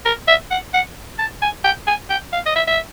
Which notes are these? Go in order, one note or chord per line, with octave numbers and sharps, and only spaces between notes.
A#4
E5
F#5
F#5
A5
G#5
G5
G#5
G5
F5
D#5
E5
E5